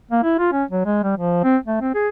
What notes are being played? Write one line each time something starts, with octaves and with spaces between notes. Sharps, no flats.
A#3
E4
F4
C#4
F#3
G#3
G3
F3
C4
A3
C4
G#4